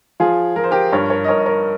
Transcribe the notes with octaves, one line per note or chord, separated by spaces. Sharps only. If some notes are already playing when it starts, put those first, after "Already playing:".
F3 F4 G#4
F3 A#4
C5
G4 A#4
G2 A#4 C#5
A#4 C#5
D#5
G2 A#4 C#5
D#5
A#4 C#5